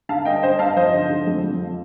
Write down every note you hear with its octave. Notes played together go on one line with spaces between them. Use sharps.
D3 F5 A5
G2 D#5 G5
G2 C5 D#5
G2 F5 A5
F3 C5 D#5
D3
D3
F2
F2
F3